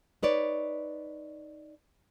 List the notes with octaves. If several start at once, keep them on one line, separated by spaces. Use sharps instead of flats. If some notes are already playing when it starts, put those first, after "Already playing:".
D#4 B4 C#5 D5